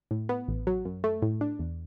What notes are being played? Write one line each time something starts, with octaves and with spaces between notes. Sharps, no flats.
A2
B3
A1
F#3
F#2
A3
A2
D4
E2